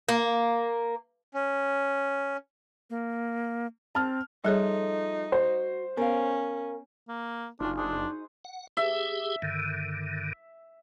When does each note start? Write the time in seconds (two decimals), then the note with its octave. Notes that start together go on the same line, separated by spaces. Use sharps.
0.09 A#3
1.34 C#4
2.90 A#3
3.95 C4 A5 F6
4.44 F3 G3 A3 D#4 G#4 A4 C#5
5.32 F#4 C5
5.97 B3 C#4 A#4 F5
7.08 A#3
7.60 F#1 D4 D#4 F4 F#4 G#5
7.77 D4 G#4 C5 F#5
8.45 F#5
8.77 G4 G#4 E5
9.42 G2 D3 D#3